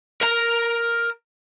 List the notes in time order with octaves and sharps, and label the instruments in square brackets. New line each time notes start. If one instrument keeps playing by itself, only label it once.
[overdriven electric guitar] A#4 A#5